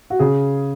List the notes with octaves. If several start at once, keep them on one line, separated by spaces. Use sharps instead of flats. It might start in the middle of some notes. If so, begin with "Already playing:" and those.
F#4
C#3 G#4